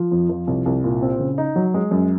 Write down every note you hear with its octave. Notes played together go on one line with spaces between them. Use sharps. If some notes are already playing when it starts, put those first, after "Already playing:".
Already playing: F3
F2
F3
C2
C2
A#2
C4
C#3
D#4
F#3
G#3
F#2